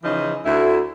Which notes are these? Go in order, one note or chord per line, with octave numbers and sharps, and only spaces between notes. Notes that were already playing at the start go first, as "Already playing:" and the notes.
C#3 E3 F3 D#4
D2 E4